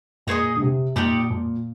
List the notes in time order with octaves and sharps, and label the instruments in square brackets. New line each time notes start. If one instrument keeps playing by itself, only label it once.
[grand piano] A#2 [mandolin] D#4 G#4 C5 D#5
[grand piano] D3
C3
[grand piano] A#2 [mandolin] D#4 G4 D5
[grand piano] A#2